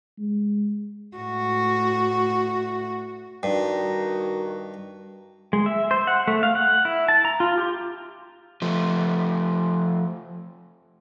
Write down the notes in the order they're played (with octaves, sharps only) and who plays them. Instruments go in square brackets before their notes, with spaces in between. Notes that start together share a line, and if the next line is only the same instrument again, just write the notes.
[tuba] G#3
[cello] A2 F#4
[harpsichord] G2 [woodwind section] D#3 D#4 F#4
[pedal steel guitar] G#3
E5
C5
F#5
A3
F5
F#5
E4
A5
A#5
F4
G4
[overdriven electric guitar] F3 A3